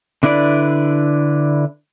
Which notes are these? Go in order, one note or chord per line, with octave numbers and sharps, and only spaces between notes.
D3 D4 E4 B4 D5